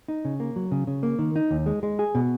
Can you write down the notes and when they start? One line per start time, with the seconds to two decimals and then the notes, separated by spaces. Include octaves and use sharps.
0.08 D#4
0.25 C#3
0.40 A#3
0.56 F#3
0.72 C#3
0.87 C#3
1.03 A#3
1.19 D#3
1.36 D#4
1.51 D#2
1.66 G#3
1.83 G#3
1.99 G#4
2.15 B2